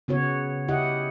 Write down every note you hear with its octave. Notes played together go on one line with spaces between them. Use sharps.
C#3 B3 F#4 C#5
C#3 E4 G4 D#5 F#5